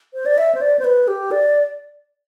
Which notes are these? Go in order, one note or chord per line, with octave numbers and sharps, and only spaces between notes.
C5
D5
E5
C5
D5
C5
B4
G4
D5